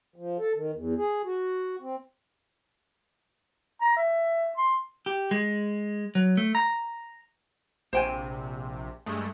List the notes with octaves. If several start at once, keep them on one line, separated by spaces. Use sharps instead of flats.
F3
A4
D#3
E2
G#4
F#4
C4
A#5
E5
C6
G4
G#3
F#3
A3
A#5
A#1 C3 C5 G5 G#5
G2 G#3 A3